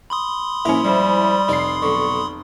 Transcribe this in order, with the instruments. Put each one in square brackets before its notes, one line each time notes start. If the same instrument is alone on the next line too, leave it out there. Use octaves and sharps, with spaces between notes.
[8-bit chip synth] B5 C6 D#6
[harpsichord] A#1 A#5 D6 [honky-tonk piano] C#4 E4
[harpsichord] G#2 F3 [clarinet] G3
[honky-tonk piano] F1 C7 [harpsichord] D#4 D5
[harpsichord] B1 D3 [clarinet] C#6